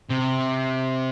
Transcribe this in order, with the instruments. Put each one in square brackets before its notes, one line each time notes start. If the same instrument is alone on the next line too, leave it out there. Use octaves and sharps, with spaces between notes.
[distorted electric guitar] C3